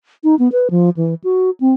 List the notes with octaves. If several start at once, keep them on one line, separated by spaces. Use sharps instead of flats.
D#4
B3
B4
F3
E3
F#4
C4